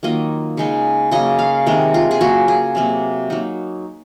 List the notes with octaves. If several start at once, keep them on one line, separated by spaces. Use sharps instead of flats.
D#3 F#3 A#3 F4 D#5
C#3 G#3 D#4
C#3 F#3 A#3 D#5
F5
C3 D#3 G#3 A#4
F4
G#4
C#3 F#3 A#3 F#4
G#4
C3 F#3 A#3
F#3 A#3 D#4